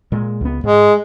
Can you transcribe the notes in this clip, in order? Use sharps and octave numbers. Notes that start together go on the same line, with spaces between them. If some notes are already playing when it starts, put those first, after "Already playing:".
A#2 G#3
C#2 B3
G#2 G#3